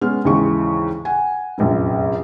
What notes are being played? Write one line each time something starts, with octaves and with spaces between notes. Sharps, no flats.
G#3 B3 C#4 F6
D#2 G#2 C#3 E3 G#3 C#6
F#5 G#5
F1 A#1 F#2